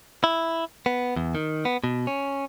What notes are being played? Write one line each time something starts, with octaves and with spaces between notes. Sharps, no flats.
E4
B3
E2
D#3
B3
B2
C#4